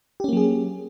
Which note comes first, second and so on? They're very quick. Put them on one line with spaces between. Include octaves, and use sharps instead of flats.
G4 C#4 A#3 F#3 G#4